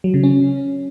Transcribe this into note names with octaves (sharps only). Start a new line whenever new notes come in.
F#3
C#3
C#4